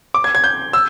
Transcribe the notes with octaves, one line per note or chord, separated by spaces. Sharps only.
D6
G#6
G#6
G6
E6